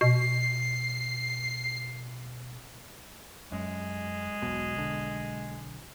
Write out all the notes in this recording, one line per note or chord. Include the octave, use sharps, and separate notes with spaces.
B2 C7
F#2 G#3
E1 B1 B2
B1 D3